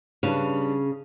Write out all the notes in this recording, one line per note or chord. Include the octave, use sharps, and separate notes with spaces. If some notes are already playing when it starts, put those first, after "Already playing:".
C#3 G3 D4 B4